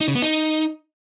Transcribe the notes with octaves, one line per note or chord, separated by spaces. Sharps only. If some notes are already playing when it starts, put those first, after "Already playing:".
D#4
C#3
B3
D#4